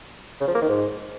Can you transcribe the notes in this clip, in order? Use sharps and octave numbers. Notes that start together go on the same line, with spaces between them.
C#3
F3
A#3
D#3
G#2